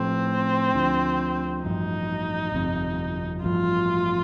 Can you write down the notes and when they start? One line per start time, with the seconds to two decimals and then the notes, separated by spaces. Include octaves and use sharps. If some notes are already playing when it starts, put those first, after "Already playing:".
Already playing: A2 F3 A3 C4
0.74 D2 D3 F3
1.64 A1 G2 F3 D#4
2.55 G1 F2 C3
3.44 A1 G2 F3 F4